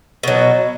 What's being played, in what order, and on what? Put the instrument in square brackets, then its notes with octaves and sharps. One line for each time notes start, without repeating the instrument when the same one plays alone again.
[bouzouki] B2 F#3